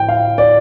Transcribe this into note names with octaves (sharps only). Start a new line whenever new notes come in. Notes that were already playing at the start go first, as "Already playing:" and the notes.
Already playing: A2 G5
F5
D5